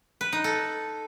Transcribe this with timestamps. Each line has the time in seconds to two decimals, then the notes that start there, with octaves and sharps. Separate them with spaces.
0.21 B4
0.32 D#4
0.44 A4